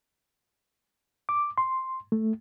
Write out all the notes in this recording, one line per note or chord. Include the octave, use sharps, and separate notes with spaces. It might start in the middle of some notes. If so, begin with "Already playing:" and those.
D6
C6
A3